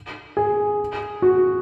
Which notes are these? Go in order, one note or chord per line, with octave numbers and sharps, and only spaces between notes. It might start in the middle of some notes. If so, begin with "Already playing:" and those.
G#4
F#4